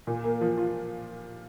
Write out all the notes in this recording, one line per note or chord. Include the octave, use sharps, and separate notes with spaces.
A#2
A#3
F3
F4